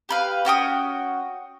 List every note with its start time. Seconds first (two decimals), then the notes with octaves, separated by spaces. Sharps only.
0.09 G4 B4 F5
0.45 C#4 F#4 G5 D#6